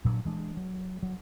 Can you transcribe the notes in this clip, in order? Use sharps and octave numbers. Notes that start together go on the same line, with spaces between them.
A#2 F#3 C4 D4
E3 G#3 D4
F#3
F#3